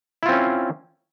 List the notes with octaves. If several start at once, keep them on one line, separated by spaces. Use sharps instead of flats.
C4 C#4 E4 F4